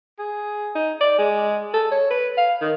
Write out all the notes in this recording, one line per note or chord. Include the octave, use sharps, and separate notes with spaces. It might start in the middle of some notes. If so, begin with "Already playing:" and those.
G#4
D#4
D5
G#3
A4
C#5
B4
F5
D#3